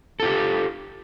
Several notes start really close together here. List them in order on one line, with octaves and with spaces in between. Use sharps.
A4 F4 G4